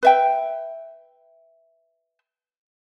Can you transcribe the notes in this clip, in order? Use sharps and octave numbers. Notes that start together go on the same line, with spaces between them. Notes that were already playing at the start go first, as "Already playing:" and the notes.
B4 E5 G5